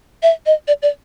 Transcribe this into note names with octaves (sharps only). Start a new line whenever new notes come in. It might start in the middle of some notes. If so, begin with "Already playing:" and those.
E5
D#5
D5
D5